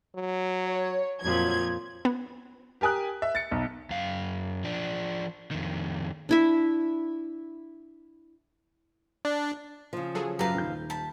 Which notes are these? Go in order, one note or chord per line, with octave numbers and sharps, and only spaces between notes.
F#3
C#5
F2 A#2 F3 F#3 G#6
B3
G4 A#4 G#5 D#6 F#6
E5
A6 C#7
B1
F#2 F5
F3 D4
F2 D#3
D4 E4 E5
D4
C#3 F3
F#3 G#4 A4
F#2 F#3 G4 A4 B4 F5 A#5
D#1 D#4 G6
A5 B5